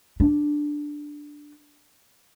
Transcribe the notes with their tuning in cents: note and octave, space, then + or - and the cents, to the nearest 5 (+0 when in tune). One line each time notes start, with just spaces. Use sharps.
D4 +5